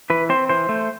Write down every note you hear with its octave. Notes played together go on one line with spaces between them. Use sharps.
E3 B4
C4 C5
E3 C5
A3